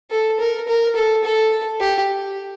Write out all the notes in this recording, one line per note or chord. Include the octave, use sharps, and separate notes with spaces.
A4
A#4
A#4
A4
A4
G4